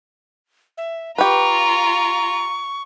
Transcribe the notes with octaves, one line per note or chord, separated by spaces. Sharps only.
E5
F4 G4 B4 A#5 C#6